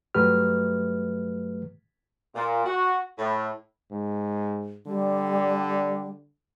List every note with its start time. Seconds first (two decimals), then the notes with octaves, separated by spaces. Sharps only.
0.15 G2 F#3 A3 G4 B4 F6
2.35 A#2
2.65 F#4
3.18 A2
3.92 G#2
4.87 D3 G3